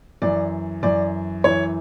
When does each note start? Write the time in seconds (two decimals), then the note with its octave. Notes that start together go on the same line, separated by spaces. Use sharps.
0.22 F#2 E3 D5
0.83 F#2 E3 D5
1.44 F#2 E3 C#5